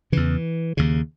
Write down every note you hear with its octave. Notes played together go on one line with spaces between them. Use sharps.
E2 C#3 E3
D#2 C#3